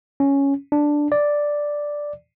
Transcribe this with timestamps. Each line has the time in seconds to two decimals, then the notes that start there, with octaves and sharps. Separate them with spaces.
0.20 C#4
0.72 D4
1.12 D5